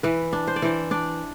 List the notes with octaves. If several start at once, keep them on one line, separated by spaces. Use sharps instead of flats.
E3 B4
D4
C5
D5
E3 C5
D4 D5